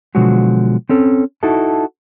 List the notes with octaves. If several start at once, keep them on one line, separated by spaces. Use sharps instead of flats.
B2 D3 F3 F#3 G#3 F#4
C4 C#4 A4
D#4 E4 F#4 A4 A5